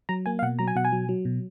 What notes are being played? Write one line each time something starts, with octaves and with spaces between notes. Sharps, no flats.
F#3 A#5
A#3 G#5
F5
B2 F#5
F#3 A#5
G#5
B2 F#5
G#5
F#3
F#3
B2